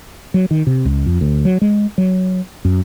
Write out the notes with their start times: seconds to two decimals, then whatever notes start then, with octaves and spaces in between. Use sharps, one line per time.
0.34 F#3
0.51 D#3
0.67 C3
0.85 C#2
1.06 F2
1.21 D2
1.45 F#3
1.62 G#3
1.98 F#3
2.65 F#2